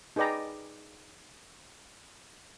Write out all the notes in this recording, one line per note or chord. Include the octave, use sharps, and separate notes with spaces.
D#4 G#4 B4 D5 G5 A#5